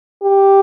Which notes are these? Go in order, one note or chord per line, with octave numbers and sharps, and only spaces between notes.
G4